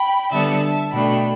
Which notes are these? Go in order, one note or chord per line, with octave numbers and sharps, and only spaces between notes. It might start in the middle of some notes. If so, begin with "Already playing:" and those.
Already playing: G5 B5
D3 G3 B3 D4 E5 A5
E5 A5
B2 A3 D4 G5 B5